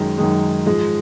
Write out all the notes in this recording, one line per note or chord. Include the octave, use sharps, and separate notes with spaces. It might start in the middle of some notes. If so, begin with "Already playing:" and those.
Already playing: F#2 D#3 G#3
F#2 D#3 G#3
G#2 F3 G#3